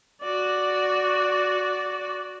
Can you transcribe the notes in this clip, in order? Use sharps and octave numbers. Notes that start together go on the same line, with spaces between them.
F#4 D5